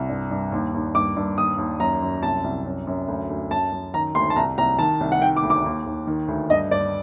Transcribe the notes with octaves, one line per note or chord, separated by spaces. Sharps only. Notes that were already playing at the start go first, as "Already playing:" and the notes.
Already playing: C2
G2
G2
D#2
D#2
G2 D6
G2
D#2 D#6
D#2
F#2 A#5
F#2
C2 A5
C2
F#2
F#2
D2
D2
F#2 A5
F#2
D#3 A#5
D2 C6
A5
C2 A#5
C2 A#5
D#3 A5
C2
F#5
D#3 G5
D6
D2
D6
D#2
D#2
D#3
D2
G2 D#5
G2 D5